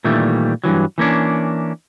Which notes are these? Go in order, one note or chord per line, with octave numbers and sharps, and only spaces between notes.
A#2 D#3 E3 G3 A3
G2 A#2 E3 F#3
E3 A#3 C#4 D4